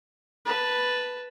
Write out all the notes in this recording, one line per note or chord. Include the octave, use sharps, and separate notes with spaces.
B4 A5